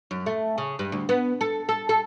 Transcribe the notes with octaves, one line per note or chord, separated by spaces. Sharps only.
F#2
A3
C#3
G2
D2
B3
A4
A4
A4